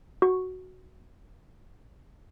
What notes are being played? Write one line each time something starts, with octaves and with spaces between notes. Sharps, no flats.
F#4 C#6